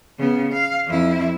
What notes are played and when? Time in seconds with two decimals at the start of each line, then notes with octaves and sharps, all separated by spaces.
0.19 C#3 B3
0.53 F5
0.87 F2 E4